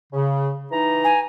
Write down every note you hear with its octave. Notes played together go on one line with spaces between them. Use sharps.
C#3
E3 D#4 A#5
G#5